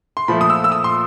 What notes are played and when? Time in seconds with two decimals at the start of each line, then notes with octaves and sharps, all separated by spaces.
0.17 C6
0.28 A#2 F3 A3 B5
0.41 D#6
0.50 E6
0.64 E6
0.72 D#6
0.84 C6